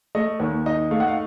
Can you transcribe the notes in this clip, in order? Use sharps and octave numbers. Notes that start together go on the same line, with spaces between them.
A3 D#5
D#2
D#4 D#5
A3 F5
F#5
F5